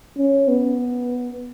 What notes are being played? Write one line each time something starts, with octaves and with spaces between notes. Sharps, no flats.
C#4
B3